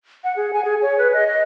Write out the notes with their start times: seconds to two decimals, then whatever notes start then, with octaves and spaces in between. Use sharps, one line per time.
0.24 F#5
0.36 G#4
0.53 G#5
0.65 G#4
0.82 C#5
0.98 B4
1.13 D#5
1.27 D#5